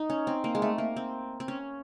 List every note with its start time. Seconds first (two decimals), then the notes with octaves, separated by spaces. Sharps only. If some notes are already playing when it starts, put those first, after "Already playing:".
Already playing: D#4
0.10 C#4
0.27 C4
0.44 A#3
0.55 G#3
0.62 A3
0.78 A#3
0.97 C4
1.40 C4
1.48 C#4